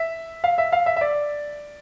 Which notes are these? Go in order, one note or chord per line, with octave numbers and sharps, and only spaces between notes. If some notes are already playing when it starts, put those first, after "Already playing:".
Already playing: E5
F5
E5
F5
E5
E5
D5